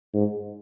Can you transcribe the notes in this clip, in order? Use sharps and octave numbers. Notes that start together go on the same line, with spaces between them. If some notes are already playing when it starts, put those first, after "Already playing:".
G#2